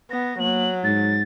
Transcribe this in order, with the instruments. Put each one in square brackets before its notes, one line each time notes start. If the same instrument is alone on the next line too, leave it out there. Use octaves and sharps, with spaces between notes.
[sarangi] B3 [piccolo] A#6
[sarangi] F#3 [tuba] A#3 [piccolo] F#7
[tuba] G#2 [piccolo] A6